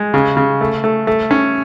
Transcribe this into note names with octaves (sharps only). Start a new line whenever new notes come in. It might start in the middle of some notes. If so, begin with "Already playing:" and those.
Already playing: G#3
C#3
C#3
A3
A3
A3
C#4